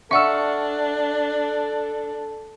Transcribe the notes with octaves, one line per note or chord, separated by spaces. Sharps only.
D4 A4 E5 F#5 C#6 E6 F6